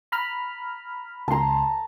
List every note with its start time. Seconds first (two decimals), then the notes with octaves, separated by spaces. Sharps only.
0.12 A#5 B5 F6
1.28 C#2 A5 A#5 C6